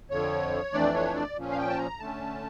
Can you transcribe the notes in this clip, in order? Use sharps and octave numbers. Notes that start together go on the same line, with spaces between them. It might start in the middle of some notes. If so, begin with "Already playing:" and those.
F2 D3 F3 C#5
F2 E3 A3 D4 D5
C#5
D5
A#2 F3 C#4
F5
G5
A5
A#5
D3 A3 C#4 A5